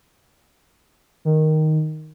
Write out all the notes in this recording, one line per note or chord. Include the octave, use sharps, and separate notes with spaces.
D#3